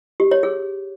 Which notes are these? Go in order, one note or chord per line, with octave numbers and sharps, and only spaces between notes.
G4
C#5
G#4